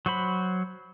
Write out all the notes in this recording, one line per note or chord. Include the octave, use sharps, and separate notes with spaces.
F#3 F#4 C5 B5